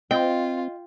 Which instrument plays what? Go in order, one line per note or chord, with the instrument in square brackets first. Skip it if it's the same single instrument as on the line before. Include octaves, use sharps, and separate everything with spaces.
[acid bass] C4 [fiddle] F4 [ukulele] D#5 [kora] G5